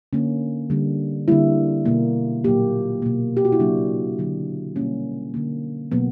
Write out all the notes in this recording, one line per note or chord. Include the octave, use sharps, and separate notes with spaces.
D3 A#3 C#4
D3 G3 A#3
D3 G3 A#3 E4
B2 A#3
A#2 F#3 A#3 G4
B2 A#3
G4
F#4
E4
C#3 F#3 A#3 D4
D3 F#3 A#3
B2 G3 A#3 C#4
D3 A#3
B2 F#3 A#3 B3